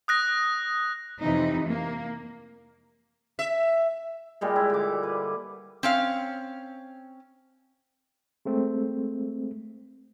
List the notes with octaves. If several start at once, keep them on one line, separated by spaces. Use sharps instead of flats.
D#6 F#6 A#6
F2 C3 E3 D#4
A#3
E5
A#2 G3 G#3
E4 D5
D3 D6
B4
C4 C#4 F5
G#3 A3 C4